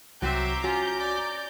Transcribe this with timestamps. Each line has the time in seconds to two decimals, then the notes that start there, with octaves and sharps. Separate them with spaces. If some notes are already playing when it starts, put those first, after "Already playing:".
0.22 C2 F#3 C4 E5 A#5 C6 D6 G6
0.64 C#4 F4 F#4
0.98 D5